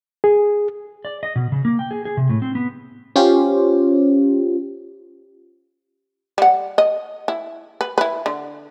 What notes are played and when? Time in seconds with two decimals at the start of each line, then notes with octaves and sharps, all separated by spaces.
0.24 G#4
1.05 D5
1.23 D#5
1.36 B2
1.52 C#3
1.65 A#3
1.79 G5
1.91 G#4
2.05 G#4
2.17 C3
2.29 A2
2.42 C4
2.55 B3
3.16 C#4 F4 G4 C5
6.38 G3 F#5
6.78 D#5
7.28 E4
7.81 B4
7.98 E4 B4
8.26 D3